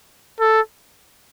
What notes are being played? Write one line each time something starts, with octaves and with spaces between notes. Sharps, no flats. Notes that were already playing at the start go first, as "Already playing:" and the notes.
A4